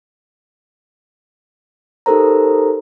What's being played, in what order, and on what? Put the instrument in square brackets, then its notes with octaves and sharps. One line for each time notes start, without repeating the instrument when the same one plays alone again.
[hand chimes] D#4 G4 A4 A#4 C5 A#5